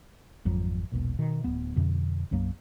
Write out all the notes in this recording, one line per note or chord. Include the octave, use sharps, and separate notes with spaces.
G#1 F2 F#3
E1 B1 A#2
B2 D#3
D1 B3
F2 B2 D3
B1 F#2 F#3 A#3